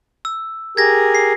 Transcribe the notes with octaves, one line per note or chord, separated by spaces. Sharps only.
E6
G4 G#4 A#4 G#6 A#6
C7